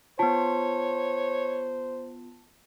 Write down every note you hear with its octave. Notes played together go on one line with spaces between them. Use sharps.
B3 F4 C5 C#5 A5